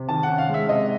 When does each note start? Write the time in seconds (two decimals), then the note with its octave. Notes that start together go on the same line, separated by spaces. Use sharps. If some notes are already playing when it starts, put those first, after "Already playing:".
Already playing: C3
0.09 D#3 A5
0.23 F#5
0.29 C#4
0.38 F5
0.49 G#3 E5
0.68 C3 D#5